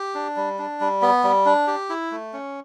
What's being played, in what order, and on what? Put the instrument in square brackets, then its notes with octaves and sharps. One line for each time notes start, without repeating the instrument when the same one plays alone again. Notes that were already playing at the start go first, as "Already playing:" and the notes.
Already playing: [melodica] G4
D4
G3
D4
G3
B3
G3
D4
G4
E4
A3
C#4